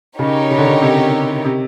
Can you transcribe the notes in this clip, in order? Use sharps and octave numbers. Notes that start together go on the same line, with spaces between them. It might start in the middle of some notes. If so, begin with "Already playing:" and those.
C#3 D#4 G4 A#4 C#5
C#3
D3
C#3
C3
C3